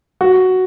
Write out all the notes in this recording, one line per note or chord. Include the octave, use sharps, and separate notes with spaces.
F#4